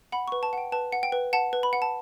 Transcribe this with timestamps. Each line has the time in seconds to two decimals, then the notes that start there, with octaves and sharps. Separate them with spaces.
0.12 F#5 B5
0.28 B4 C#6
0.43 A5
0.53 F#5 G5
0.72 B4 A5
0.92 F#5
1.03 G5
1.12 B4
1.33 F#5 A5
1.53 B4
1.63 B5
1.73 F#5
1.82 A5